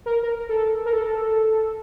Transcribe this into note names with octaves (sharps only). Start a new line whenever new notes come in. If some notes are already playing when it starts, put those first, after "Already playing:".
A#4
A#4
A4
A#4
A4